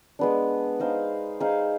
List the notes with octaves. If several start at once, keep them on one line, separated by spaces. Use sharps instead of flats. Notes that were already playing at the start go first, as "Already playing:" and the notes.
G#3 B3 D4
D#4 G#4 C5 F5
D#4 G#4 C5 F5